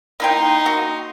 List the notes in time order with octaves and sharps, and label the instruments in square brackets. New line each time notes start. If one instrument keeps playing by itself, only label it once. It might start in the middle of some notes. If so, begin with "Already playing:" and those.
[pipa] A#3 E4 G5 [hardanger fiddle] D#4 C6
[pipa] A#3 F#4